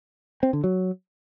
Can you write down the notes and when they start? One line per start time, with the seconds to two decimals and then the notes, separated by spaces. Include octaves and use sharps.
0.43 C4
0.53 D3
0.64 F#3